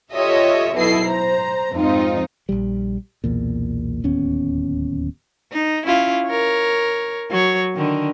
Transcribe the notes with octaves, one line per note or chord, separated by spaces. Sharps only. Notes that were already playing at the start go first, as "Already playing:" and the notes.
F4 G4 A4 C#5 D#5 E5
B1 B2 E4 A4 D#5 C7
C5 A#5
F2 G#2 C4 D#4 F4
A#1 D#2 G3
B1 E2 A#2
D1 D#2 B3 C#4
D#4
C#4 E4 F4
A#4 C#5
F#3 C#5
D3 D#3